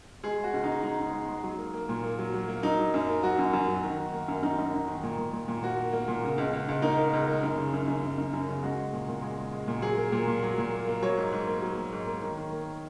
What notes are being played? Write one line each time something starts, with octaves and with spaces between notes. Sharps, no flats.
G#3 G#4
G#3
F#4
C#2
C#2 D#4
G#3 D#4
C#2
G#3
G#3
F#3
A#3
A#3
A#2
A#3
F#3
F#3
A#3
F#3 D#4
F#3
F#2
A#3
F#3 F#4
F#2
F#2
F#3
D#3
D#3
A#3
F#2
F#2 D#4
F#2
F#2
D#3
A#2
A#2
A#2
A#2
A#3 F#4
A#3
A#3
A#2
C#3
C#2
C#2
C#2
A#3 D#4
A#3
C#2
A#3
F#2
C#3
F#2
F#2
F#2
F#2
F#2
C#3
G#3 F#4
G#3
A#2
A#2
G#3
G#3
G#3
A#2
F#3 G#4
A#3
A#2
A#2
F#3
A#2
A#3
A#3
F#3 C#5
G#2
G#2
A#3
F#3
A#3
G#2
A#3
D#3
D#3
A#3